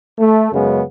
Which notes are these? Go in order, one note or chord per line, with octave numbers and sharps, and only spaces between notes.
A3
F#2 C#3 G#3 B3